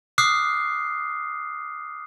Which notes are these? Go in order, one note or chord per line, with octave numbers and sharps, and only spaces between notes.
D6 D#6 F6 F#6 C7